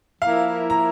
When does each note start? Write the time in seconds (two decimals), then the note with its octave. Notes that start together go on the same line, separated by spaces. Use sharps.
0.22 F3 A#3 E4 A#4 F5
0.70 A#5